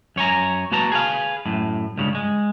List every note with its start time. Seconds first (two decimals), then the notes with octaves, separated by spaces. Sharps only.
0.16 F#2 C#5 G#5 A#5
0.72 A#3 F#4 B4 A5 A#5
0.92 G#4 B4 F5
1.45 F#2 A2
1.98 C#2 G2 C#3
2.15 G#3